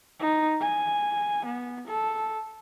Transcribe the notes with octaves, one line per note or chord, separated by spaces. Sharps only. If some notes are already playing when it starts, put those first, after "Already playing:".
D#4
G#5
B3
A4